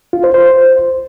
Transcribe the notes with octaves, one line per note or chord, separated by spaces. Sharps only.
F4
C5
C5